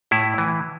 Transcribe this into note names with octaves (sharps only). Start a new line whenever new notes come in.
A2 E4
E3